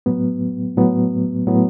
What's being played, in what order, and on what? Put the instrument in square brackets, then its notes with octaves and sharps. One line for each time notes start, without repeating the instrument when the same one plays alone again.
[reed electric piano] A2 F#3 B3
A2 F#3 B3
A2 F#3 B3